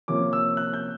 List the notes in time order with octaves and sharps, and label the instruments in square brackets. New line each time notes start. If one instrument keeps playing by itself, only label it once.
[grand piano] C3 F3 A#3 C#4 D6
E6
F#6
G6